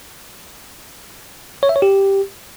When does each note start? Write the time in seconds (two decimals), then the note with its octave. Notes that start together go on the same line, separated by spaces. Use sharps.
1.63 C#5
1.69 E5
1.76 C#5
1.82 G4